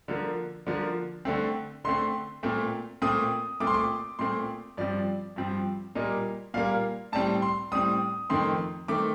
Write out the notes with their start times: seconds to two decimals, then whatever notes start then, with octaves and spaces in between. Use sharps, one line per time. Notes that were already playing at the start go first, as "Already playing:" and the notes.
0.08 D3 F3 A#3
0.67 D3 F3 A#3
1.25 D3 A3 C4
1.84 D3 A3 C4 C6
2.43 A#2 A3 C4
3.02 A#2 A3 C4 D#6
3.60 A#2 A3 C4 D6
3.67 C6
3.74 D6
4.19 A#2 A3 C4 C6
4.77 G2 F3 C4 D5
5.36 G2 F3 C4
5.95 A#2 G3 A#3 D#5
6.54 A#2 G3 A#3 F5
7.12 A2 G3 C4 A5
7.42 C6
7.72 A2 G3 C4 D#6
8.30 F2 D#3 A3 C4 C6
8.88 D#3 A3 C4 D6